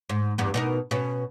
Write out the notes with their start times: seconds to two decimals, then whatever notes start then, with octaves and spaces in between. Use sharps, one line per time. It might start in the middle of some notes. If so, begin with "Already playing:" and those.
0.09 G#2
0.38 E2 G2 B3
0.54 B2 D#4 A#4
0.91 B2 C#4